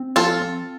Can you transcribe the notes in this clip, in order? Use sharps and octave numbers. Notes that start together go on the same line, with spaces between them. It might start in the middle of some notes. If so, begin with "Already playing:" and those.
Already playing: C4
F3 F4 A4
C4